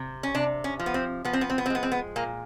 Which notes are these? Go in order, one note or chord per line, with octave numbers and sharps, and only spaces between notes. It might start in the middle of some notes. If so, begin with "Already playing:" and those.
Already playing: C3
C#4
C3 D4
C#4
F3
B3
C4
F3 B3
C4
B3
C4
B3
C4
G#3 B3
C4
B3
A#2 A#3